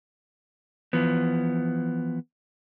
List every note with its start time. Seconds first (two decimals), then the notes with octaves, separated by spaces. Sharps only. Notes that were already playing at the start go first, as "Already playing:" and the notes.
0.93 E3 F3 B3